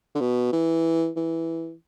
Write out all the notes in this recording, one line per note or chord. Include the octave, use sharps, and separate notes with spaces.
D3
B2
E3
E3